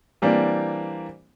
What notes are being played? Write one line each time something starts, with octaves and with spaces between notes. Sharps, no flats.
E3 G3 A#3 C4 D4